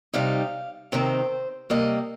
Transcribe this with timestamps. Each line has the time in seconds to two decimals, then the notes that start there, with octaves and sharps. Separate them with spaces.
0.13 C3 G3 D#4 F5
0.92 C3 D#3 C4 C5
1.70 C3 G3 A#3 D#5